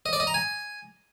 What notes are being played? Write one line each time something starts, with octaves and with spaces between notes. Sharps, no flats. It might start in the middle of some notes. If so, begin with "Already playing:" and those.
D#5
D5
D#5
A#5
G#5